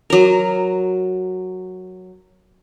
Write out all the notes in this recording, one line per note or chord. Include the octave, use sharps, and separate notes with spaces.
F#3 A#4